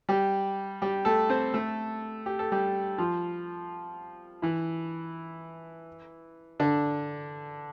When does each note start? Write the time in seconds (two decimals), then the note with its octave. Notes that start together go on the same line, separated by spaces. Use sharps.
0.09 G3 G4
0.82 G3 G4
1.05 A3 A4
1.30 C4 C5
1.54 A3 A4
2.26 G4
2.39 A4
2.52 G3 G4
2.98 F3 F4
4.42 E3 E4
6.60 D3 D4